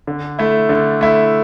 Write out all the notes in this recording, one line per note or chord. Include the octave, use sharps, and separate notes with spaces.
D3
A3 E4
D3
A3 E4